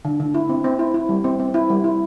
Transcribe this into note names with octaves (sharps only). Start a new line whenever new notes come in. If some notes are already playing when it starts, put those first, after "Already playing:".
D3
D3
E4
C4
C4
E4
E4
G3
C4
C4
E4
G3
E4